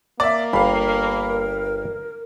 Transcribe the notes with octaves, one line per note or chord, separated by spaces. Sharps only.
A#3 D5 E5
G1 G2 A#4 F5 B5